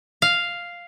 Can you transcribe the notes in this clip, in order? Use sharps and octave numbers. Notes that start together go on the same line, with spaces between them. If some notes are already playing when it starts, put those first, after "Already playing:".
F5